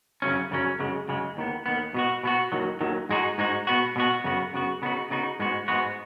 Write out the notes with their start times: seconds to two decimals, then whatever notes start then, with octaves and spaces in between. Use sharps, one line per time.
0.22 F#2 C#3 F#3 C#4
0.51 F#2 C#3 F#3 C#4
0.79 F#2 C#3 G#3
1.08 F#2 C#3 G#3
1.37 D#2 D#3 B3
1.66 D#2 D#3 B3
1.94 B2 B3 F#4
2.24 B2 B3 F#4
2.52 D#2 D#3 F#3
2.81 D#2 D#3 F#3
3.09 G#2 G#3 D#4 F#4
3.38 G#2 G#3 D#4 F#4
3.67 B2 B3 F#4
3.96 B2 B3 F#4
4.24 F#2 C#3 B3 F#4
4.53 F#2 C#3 B3 F#4
4.82 C#3 B3 D#4 F#4
5.11 C#3 B3 D#4 F#4
5.40 G#2 G#3 B3 F#4
5.68 G#2 G#3 B3 F#4